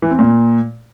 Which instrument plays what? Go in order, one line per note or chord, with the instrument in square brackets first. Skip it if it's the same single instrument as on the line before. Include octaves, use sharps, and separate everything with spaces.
[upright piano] E3
C4
A#2